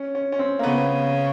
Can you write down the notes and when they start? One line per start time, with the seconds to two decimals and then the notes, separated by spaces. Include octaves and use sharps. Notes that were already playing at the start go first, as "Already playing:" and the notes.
Already playing: C#4
0.15 C#4
0.32 C#4
0.39 C4
0.59 A#3
0.63 C#3 B3